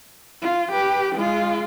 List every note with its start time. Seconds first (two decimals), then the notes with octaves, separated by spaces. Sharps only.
0.42 F4
0.72 G4 B4
1.15 G#3 F4